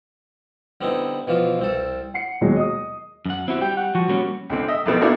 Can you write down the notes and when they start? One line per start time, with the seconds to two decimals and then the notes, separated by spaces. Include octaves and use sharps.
0.81 D3 G3 B3 C4 D#4 E4
1.27 B2 E3 F3 F4
1.59 C2 C4 A4
2.14 F#5 C7 C#7
2.41 D#2 B2 F#3 G#3
2.56 D#5 D#6
3.26 F#2 F#5
3.48 C4 E4 F#4 G4
3.61 G3 G5
3.77 F#5
3.95 F3 F#4
4.09 G3 A#3 C#4
4.50 C#2 D3 C4
4.68 D#5 E5
4.86 B1 F2 B2 B3 C4
5.01 A#3 B3 D4 E4 F#4 A#4